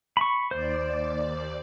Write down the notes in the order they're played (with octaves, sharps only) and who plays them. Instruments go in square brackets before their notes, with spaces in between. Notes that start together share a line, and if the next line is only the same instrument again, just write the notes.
[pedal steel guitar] B5 C#6
[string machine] D#2 D5 [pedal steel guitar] C5